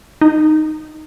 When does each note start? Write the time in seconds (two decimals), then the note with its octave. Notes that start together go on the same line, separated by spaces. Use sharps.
0.21 D#4